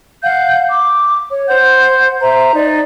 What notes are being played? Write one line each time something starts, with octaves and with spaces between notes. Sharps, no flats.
F5 F#5 G6
D6
C#5
C5 F#5 G6
C5 E5 A#5
D#4 D5